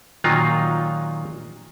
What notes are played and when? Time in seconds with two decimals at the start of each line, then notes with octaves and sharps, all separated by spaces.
0.24 A#2 D#3 F#3 D#4 F4